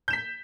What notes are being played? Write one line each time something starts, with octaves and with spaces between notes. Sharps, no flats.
G6 B6 E7